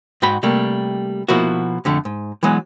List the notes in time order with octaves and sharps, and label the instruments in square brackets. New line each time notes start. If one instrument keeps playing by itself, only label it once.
[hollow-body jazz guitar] G#2 F#4 G5 B5
C3 G3 A3 A#3
B2 F3 A#3 E4 F#4
F2 D3 A3
G#2
E3 F#3 G#3 B3